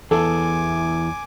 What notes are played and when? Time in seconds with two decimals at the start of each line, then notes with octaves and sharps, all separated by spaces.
0.11 E2 A4 G#5 D6